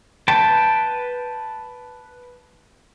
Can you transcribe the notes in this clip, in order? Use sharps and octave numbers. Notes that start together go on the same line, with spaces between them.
B4 G5 A5